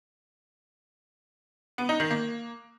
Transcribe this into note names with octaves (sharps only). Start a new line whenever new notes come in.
B3
D#4
D#3
A#3